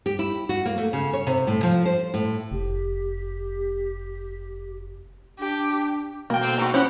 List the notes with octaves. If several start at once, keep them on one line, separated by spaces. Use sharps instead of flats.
G4
E4
F#4
A#3
A3
C#3
C#5
C3
A2
F3
C5
A2
F1 G4
D4 G4
B2 A#3 G5
D3 C4
G#2 F#4 A#5
C#4 E4 G4 C5 C#5 F#5